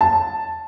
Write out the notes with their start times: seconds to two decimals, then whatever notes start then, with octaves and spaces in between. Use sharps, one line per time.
0.01 A5